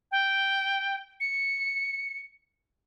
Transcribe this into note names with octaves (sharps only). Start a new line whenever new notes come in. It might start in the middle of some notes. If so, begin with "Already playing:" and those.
G5
C#7